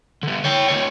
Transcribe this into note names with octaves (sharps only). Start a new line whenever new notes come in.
D3 G3
C#5 G5
D2 C#5